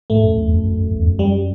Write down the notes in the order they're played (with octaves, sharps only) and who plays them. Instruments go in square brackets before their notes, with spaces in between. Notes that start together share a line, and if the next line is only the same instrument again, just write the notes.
[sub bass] A2 [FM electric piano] A3
[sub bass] F#2
E2
F#2
F#2
F#2
E2
F#2
[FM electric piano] G3